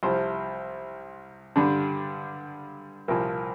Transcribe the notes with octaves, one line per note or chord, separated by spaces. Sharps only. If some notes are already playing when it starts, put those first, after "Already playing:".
C2 C3 F3 C5
G2 D3 G3 D4
C2 A#2 F3 A#3